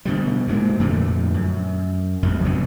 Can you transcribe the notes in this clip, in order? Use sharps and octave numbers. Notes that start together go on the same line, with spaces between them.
B2 D3 G3
D2 G#2 A#3
F2 A#2 D3 A3
F#2
A1 F2 G3
C2 F#2 B2 D3